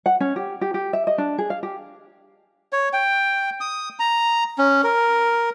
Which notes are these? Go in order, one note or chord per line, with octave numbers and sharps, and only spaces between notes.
F#5
C#4
G4
G4
G4
E5
D#5
D4
G#4
F5
G4
C#5
G5
D#6
A#5
C#4
A#4